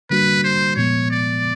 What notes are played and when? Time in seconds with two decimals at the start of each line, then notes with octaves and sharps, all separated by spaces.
0.10 D3 G3 A#3 D4 F#4 B4
0.44 C5
0.77 A#2 F3 G#3 B3 C#5
1.10 D5